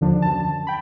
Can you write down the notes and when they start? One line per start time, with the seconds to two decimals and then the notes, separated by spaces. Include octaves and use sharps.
0.01 D#2 D3 F3 D4
0.22 F#2 A5
0.67 G5 B5